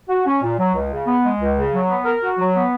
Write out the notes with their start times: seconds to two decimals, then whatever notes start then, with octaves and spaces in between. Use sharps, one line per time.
0.09 F#4
0.26 C#4
0.42 A#2
0.58 F#3
0.74 C#2
0.91 C#3
1.07 B3
1.24 G#3
1.39 C#2
1.56 C#3
1.72 F#3
1.89 B3
2.05 A#4
2.22 F#4
2.38 F#3
2.55 B3